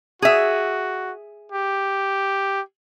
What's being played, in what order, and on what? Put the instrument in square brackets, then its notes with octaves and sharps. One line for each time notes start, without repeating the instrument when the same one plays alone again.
[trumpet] F#4 [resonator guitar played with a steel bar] G#4 E5
[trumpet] G4